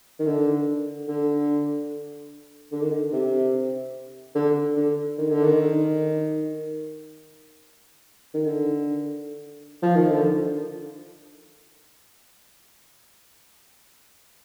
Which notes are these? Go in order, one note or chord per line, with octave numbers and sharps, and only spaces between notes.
D#3
D3
D3
D3
D#3
D3
C3
D3
D3
D#3
D3
D#3
D#3
D3
F3
D#3
D3